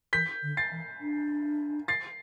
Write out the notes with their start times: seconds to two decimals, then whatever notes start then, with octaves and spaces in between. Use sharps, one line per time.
0.13 E3 G6 B6
0.43 D3
0.57 A6 C7
0.71 E3
1.01 D4
1.88 A6 C7